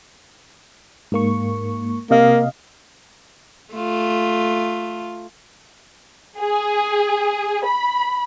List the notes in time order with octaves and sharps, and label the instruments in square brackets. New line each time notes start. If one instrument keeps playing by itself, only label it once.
[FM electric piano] G#2 A#3 C#6
[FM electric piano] C3 D#5 F5 [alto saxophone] A#3
[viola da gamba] A3 F4
[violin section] G#4
B5